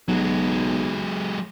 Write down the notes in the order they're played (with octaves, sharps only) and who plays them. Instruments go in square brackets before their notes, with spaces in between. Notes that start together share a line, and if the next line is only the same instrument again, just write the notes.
[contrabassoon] B1 [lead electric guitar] F#3 G#3